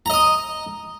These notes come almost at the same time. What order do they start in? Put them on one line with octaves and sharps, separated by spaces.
A#5 D#5 D#6